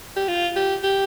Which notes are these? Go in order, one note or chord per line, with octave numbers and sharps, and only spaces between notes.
G4
F4
G4
G4